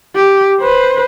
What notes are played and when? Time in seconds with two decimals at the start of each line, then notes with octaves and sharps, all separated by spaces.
0.16 G4
0.61 B4 C5